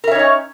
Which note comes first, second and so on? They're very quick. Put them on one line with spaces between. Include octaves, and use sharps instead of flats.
A#4 E5 C#5 D#4 C#4